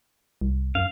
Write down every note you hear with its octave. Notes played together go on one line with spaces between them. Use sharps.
C2
F#2 F5